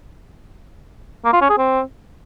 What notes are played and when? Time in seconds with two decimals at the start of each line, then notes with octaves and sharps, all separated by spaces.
1.25 A#3
1.33 F4
1.41 C#4
1.50 G#4
1.58 C4